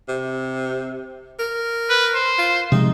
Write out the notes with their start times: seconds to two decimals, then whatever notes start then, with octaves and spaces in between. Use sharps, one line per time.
0.08 C3
1.39 A#4
1.89 B4
2.15 C5
2.38 F4
2.72 C3 F3 G#3 D#4